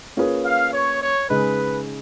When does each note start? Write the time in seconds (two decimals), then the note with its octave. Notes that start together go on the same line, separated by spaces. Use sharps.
0.17 A#3 C#4 F4 G#4 B4
0.45 F5
0.73 C#5
1.02 C#5
1.30 C#3 G#3 D#4 B4